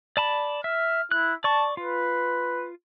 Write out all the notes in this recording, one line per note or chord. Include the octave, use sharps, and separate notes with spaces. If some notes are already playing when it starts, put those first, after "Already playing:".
D5 A5 B5
E5 F6
E4 F#6
D5 A5 C#6
F4 B4